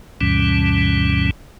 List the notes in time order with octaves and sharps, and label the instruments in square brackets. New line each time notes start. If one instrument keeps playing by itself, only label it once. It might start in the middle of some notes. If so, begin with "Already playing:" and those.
[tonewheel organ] D2 G2 B2 E3 G3 C#4